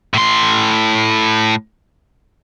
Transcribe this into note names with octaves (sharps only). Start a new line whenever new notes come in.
A2 C6